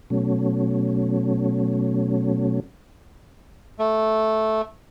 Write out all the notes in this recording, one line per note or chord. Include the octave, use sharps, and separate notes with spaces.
B2 F#3 A3 C#4
A3